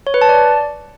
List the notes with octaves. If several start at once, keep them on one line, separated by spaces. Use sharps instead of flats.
C#5
B4
A5
D5